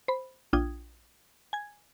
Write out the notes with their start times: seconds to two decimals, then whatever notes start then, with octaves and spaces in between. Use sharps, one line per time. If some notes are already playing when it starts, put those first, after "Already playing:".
0.08 C5 B5
0.53 A#1 D4 F4 G5 D#6 G#6
1.53 G#5 G#6